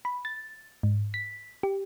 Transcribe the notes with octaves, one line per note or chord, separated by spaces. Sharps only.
B5
A6
G#2
B6
G4